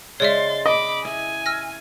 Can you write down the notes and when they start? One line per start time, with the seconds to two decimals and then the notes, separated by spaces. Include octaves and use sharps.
0.20 C#3 G#3 C#5 D5 E5 C6 A6
0.66 D#5 B5 D6
1.05 E4 G#5
1.46 E6 F6 A#6